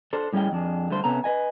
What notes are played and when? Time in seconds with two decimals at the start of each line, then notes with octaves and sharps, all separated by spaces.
0.13 D4 A4 C5
0.33 A2 G3 C#4 G#4 D#5 G5
0.52 F2 D4 G#4
0.90 D3 G3 A3 C5
1.04 C3 B3 C#4 A4 A#5
1.24 B4 D#5 G#5